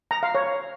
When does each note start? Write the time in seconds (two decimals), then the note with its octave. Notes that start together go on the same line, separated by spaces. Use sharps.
0.11 A#5
0.23 F5
0.35 C#5